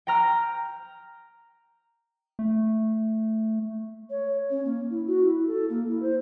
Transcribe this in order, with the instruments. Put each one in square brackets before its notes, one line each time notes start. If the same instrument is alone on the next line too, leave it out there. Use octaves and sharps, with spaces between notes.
[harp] G5 A#5 F6
[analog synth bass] A3
[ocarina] C#5
C#4
A#3
E4
F#4
E4
A4
A#3
E4
C5